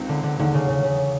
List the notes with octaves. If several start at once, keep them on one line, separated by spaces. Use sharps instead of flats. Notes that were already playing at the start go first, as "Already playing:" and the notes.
Already playing: C#2 C3 D#3 G#3 C4
D3
D3
E1 D#2 D3 D#3
C#3
C#3
C#3